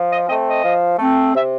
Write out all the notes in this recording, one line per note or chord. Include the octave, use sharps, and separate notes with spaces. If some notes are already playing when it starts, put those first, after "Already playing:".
Already playing: F3
D#5
A3 C4 D#5
D#5
F3
A3 C4
C3 E5